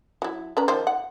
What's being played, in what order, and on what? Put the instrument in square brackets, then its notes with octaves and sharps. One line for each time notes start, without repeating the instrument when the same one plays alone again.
[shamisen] F#3 E4
C#4 B4 A#5
D#3 F3 C5
F#5